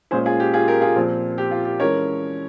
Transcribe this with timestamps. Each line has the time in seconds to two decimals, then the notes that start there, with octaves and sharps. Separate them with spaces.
0.11 A#2 G#3 C#4 G#4 C5
0.26 F4 G#4
0.40 G4
0.54 F4 G#4
0.68 G4 A#4
0.81 F4 G#4
0.96 A#2 F3 C4
1.38 G4
1.51 F4
1.65 G4
1.80 E3 G#3 C#4 A#4 C#5